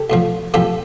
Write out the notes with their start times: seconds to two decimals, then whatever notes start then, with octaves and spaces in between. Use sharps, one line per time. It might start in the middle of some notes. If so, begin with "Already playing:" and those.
Already playing: G4 A4
0.10 B1 A2 F3
0.54 B1 A2 F3 G4 A4